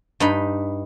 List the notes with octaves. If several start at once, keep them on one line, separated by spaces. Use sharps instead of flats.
G2 D#4 B5